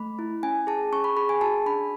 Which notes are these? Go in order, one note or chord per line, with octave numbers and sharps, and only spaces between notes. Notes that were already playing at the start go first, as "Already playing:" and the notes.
Already playing: A3 B5
E4
C#4 G#5
G#4 A5
C#4 C#6
B5
G#4 B5
G#5
F#4 A5
D4 B5